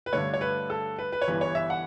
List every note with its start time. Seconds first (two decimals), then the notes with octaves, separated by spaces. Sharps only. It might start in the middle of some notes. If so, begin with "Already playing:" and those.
0.06 B4
0.13 G2 D3 A3 C#5
0.34 C#5
0.41 B4
0.70 A4
0.99 B4
1.12 B4
1.22 C#5
1.27 G1 G2 E3 B4
1.41 C#5
1.55 E5
1.70 F#5